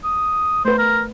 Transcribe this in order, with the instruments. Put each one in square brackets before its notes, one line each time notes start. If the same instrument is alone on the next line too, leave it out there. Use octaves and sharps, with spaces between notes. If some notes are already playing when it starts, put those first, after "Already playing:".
[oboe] D#6
[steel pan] A3 B4 [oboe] C5
[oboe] A#4